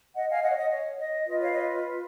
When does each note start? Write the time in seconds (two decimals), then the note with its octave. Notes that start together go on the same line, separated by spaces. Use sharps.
0.15 D#5 F#5
0.28 F5 G#5
0.42 D#5 F#5
0.50 C#5
0.56 D#5
0.70 C#5
0.98 D#5
1.25 F4 B4 D#5
1.40 C#5 F5
1.53 D#5